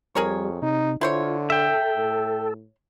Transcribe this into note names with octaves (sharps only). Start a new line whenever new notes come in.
F2 G3 G#4 A#4 C#5
C3 D#4
D3 E4 F4 C5 C#5
A4 E5 G5
A2